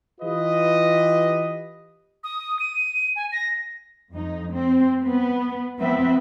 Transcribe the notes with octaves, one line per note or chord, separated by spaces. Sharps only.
E3 F4 G4 B4 D#5
D#6
D#7
G#5
A#6
F2 D#4
C4
B3 B4
F3 B3 C4 B4 E5